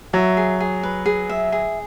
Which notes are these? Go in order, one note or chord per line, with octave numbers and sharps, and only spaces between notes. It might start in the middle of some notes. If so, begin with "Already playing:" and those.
F#3 E5
G#4
G#4
B4
G#4
E5
G#4